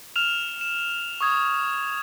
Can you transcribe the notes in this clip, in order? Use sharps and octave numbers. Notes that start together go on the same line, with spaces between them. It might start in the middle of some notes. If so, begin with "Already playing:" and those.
F6 E7 F7
E7
C#6 D#6 G#6